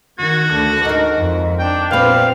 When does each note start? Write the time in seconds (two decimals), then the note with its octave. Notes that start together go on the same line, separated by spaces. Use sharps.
0.19 D#3 F#4 G#6
0.53 D2 D3
0.85 G#2 D#4 A#4
1.18 F2
1.59 D4 G5
1.91 A#2 G3 B3 C4 B4 F5